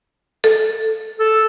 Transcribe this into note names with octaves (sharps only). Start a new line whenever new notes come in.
A4
A4